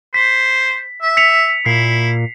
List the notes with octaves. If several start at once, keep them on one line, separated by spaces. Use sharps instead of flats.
C5 B6
E5
B6 C#7 F7
A#2 E4 C7